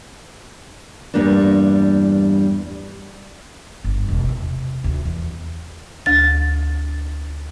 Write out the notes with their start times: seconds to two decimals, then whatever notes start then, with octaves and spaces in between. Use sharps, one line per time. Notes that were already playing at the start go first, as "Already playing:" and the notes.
1.14 E2 G2 G3 A#3 D4
3.84 G1
4.08 E1
4.29 C3
4.84 D2
5.05 E2
6.06 D2 A6